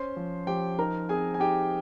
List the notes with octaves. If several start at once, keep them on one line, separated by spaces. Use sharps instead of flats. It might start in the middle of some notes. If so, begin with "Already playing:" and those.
Already playing: C#4 C5 C6
F3
F3 G4 G5
D#4 A#4 A#5
C4 G#4 G#5
G#5
D#4 G4 G5